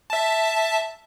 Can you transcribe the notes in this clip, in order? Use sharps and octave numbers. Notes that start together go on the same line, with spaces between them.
E5 A5